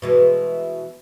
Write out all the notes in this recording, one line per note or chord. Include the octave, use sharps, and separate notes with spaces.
B2 E3 G#3